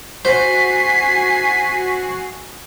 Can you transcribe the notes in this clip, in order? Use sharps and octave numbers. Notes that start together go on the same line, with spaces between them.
F#4 C5 G#5 B6 C7